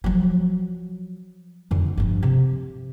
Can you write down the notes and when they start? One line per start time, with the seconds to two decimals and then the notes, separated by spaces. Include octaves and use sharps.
0.04 F3 F#3
1.71 F2 D3
1.97 G2 F3
2.23 C3